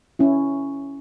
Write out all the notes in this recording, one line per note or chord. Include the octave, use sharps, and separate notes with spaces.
C#4 E4